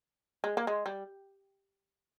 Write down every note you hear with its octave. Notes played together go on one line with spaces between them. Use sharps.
G#3
A#3
G#3
G3